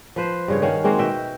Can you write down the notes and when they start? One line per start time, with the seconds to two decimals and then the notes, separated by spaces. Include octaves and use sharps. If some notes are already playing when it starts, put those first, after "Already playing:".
0.16 F3 B4 C5
0.48 G2 C#3 C#5
0.62 D#3 C#4 F5 F#5
0.84 G#3 A#3 C4 F#4
0.99 B2 D#5 E5 G5